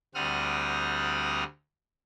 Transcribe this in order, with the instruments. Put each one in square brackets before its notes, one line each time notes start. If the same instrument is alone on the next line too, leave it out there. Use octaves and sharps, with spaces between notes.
[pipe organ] D2 G3 C4 F#5 D#6 F6